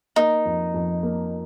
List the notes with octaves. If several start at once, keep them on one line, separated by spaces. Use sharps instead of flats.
A#3 D#4
F2
F2
A#3